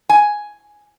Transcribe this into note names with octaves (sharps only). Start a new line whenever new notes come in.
G#5